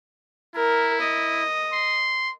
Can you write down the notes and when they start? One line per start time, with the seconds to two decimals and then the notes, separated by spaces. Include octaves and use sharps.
0.55 E4 A#4
1.01 D#5
1.73 C6